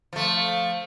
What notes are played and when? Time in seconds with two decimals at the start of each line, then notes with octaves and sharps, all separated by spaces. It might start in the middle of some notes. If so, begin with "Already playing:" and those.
0.13 F3 A3